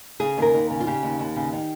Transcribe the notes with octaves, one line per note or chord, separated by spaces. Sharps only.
C#3 G#4
D#2 A#4
D#2
C#3
F4
C#3 G4
D#2
D#2
C#3
D#3